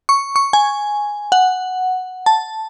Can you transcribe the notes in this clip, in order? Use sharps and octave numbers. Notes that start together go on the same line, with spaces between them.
C#6
C#6
G#5
F#5
A5